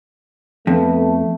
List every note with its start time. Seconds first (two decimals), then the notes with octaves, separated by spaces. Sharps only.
0.67 F2 A3 B3